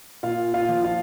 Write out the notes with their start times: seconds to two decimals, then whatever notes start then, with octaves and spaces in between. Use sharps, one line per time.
0.23 A#2 F4 F5
0.54 F4 F5
0.69 F3
0.84 F4 F5